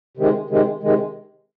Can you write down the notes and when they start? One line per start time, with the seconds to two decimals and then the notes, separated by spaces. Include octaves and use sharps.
0.17 C3 D#3 G#3
0.50 C3 D#3 G#3
0.83 C3 D#3 G#3